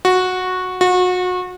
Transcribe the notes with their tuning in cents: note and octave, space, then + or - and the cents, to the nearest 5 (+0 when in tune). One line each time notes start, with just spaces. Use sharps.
F#4 -10
F#4 -30